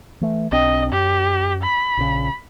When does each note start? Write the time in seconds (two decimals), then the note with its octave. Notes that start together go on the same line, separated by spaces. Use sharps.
0.21 E3 A3
0.52 B1 C4 D4 D#5
0.92 F#2 G4
1.63 B5
1.97 A#1 C#3